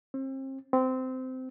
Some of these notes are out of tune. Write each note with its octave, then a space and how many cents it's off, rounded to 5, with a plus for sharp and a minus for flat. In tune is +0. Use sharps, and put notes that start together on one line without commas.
C4 +35
C4 -20